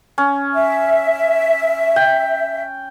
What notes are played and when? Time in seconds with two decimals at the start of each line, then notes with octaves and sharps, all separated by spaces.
0.18 C#4
0.54 E5
1.96 G5